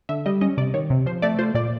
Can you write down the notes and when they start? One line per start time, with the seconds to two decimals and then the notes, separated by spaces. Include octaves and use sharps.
0.09 D3 E5
0.26 G3 D#5
0.41 C#4 D#5
0.57 C3 D5
0.74 D#3 C#5
0.90 C3
1.06 F3 C5
1.22 A3 D5
1.39 F4 C5
1.54 A#2 D5